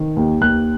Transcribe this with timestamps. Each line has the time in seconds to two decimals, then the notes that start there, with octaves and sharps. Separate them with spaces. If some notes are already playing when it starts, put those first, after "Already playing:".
Already playing: D#3
0.16 D#2
0.41 D#2 F#6